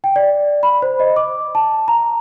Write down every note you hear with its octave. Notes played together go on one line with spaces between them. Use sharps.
G5
D5
B5
C5
D#5
D6
A5
A#5